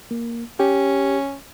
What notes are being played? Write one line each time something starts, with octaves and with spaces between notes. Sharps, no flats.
A#3
C#4 G4